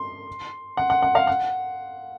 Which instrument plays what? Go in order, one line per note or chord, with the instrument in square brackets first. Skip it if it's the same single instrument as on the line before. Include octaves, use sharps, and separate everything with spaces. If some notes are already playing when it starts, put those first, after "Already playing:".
Already playing: [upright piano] C6
F#5
F#5
F#5
F5
F#5